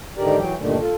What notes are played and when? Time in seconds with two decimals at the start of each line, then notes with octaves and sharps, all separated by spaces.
0.17 G#2 D3 D#3 G4 A#4 D5
0.36 E3 F#3 G5
0.59 G2 A#2 D3 D#3 A3
0.79 F4 A4